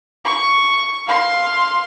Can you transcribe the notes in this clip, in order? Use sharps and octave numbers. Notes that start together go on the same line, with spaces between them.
C#6
F5 C6